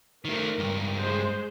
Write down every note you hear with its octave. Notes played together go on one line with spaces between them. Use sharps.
D#3 A3 A#4
C#2 G2
G#3 C5